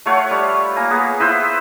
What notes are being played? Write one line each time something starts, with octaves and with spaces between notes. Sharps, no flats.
A3 F4 C#5 F#5
G3
A#3 G#5 A#5
A#3 B3 G#4
E4 B4 C5 E5